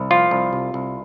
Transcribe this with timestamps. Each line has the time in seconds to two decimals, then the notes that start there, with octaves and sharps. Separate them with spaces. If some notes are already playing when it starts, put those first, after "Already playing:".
Already playing: C2
0.11 F3 F4
0.31 C2
0.53 C3
0.74 C2